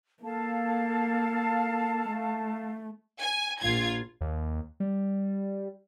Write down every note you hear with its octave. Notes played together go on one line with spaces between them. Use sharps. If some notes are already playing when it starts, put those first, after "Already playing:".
A#3 A4 F5 A5
A3
G#5
A#1 F4 G#6
D#2
G3